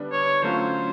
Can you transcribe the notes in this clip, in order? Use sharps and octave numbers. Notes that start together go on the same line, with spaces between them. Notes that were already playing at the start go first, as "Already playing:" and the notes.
Already playing: D3 G3 B3 D4
C#5
D3 F#3 A3 C#4 F4 C5